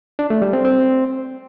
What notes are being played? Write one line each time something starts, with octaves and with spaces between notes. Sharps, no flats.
D4
A3
G3
C4
C4